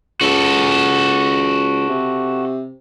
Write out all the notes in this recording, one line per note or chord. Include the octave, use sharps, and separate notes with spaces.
C#2 F#4 A4
C3